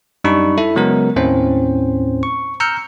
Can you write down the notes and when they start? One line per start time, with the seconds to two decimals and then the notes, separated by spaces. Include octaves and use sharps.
0.24 F#2 G3 D4 D#4 B5 C#6
0.58 E4 A4 E5
0.76 C#3 F#3 G#3 B3 A#4
1.16 D#2 A2 C4 C#4 C5
2.23 C#6
2.60 A#5 E6 F6 G6 C#7